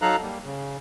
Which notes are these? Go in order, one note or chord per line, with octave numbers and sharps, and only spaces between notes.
F#3 D#4 A4 F5 A#5 F#6
G3 A#3
C#3